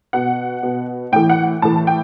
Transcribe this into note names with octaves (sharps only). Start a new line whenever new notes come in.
B2 F#5
B2
A2 E3 G5
F#5
A2 E3 A5
G5